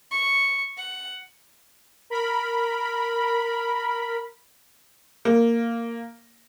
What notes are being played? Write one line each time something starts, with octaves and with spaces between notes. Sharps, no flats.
C#6
F#5
A#4 B5
A#3